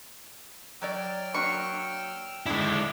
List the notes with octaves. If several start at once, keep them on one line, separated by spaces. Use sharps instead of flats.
F#3 C#5 D5 G5 E6 F6
F#3 A#3 D4 C#6
D3 D#3 G#3 D4 E4